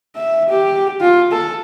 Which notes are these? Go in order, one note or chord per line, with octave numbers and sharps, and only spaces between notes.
E5
G4
F4
A4